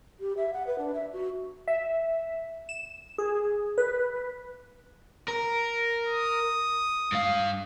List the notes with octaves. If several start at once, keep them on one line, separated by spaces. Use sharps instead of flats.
G4
E5
F#5
B4
D4
E5
F#4
E5
E7
G#4
B4
A#4
D#6
G2 F5